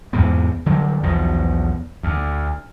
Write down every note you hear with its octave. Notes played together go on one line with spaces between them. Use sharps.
E2 G#2 C3 B3
D3 F#3 G3
B1 E2 B2 F3
D2